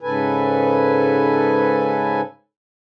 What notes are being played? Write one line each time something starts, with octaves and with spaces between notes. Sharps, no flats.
G#2 C#3 A4 B4 G#5